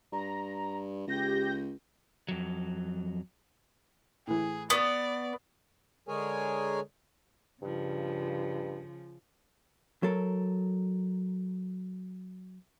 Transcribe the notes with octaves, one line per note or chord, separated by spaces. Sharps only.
G2 A#5
C#2 G4 G6 A#6
F2 F#3
A2 E3 G#4
B3 D5 C#6
D3 G#3 G#4 A#4 C#5 G#5
G2 C#3 F3
F#3 A4 A#4